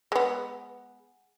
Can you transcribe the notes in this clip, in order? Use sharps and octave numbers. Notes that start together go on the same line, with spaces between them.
G#3 B3